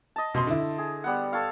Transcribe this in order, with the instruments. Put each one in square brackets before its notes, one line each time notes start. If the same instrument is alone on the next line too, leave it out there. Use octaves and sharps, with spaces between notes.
[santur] D#5 A5
[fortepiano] B2 C6 [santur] C5 D#5
[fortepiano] D3 E4
[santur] G#4
G3 B3 F#5
A4 C#5 F5